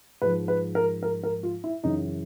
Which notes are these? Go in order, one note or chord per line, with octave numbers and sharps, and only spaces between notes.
G#2 F3 B4
B4
A#4
A#4
A#4
F4
E4
F#2 C#3 E3 D#4